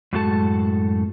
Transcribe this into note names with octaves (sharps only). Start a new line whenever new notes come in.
F#2 A2 G#3 F#4 A4 A5